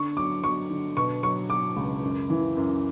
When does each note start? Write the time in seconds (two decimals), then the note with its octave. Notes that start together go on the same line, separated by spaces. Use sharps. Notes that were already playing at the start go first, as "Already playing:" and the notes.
Already playing: D3 C#6
0.17 F#3 D6
0.44 F#3 C#6
0.70 D3
0.97 B2 C#6
1.23 F#3 C#6
1.50 F#3 D6
1.76 C#2
2.03 F#2
2.30 E3
2.57 F#2